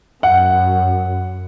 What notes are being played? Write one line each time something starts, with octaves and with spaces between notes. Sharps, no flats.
F#2 F#5